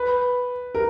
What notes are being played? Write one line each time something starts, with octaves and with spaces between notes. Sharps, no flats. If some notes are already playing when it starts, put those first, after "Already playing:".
Already playing: B4
A#4